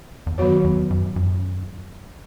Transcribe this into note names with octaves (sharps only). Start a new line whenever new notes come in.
E2
F#2 D#3 F#3 B3 F#4 C#5
E2
F#2
F#2